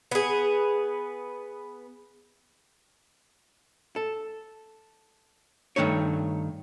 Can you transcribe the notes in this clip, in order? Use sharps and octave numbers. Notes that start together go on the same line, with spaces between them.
B3 G#4
A4
G2 B2 D#3 A3 D#4 C#5